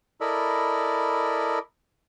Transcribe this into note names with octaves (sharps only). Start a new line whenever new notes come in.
E4 A4 A#4 D5 D#5 B5